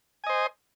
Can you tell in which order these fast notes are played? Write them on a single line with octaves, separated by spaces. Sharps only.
G#5 D#5 C5